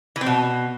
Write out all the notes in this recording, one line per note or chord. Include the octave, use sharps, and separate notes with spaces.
E3
C4
B2